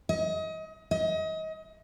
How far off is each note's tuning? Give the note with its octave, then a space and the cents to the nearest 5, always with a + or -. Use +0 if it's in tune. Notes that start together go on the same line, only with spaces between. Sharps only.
D#5 +30
D#5 +30